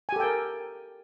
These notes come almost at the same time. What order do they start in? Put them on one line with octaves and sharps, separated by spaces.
G#5 G4 A4 G5 A#4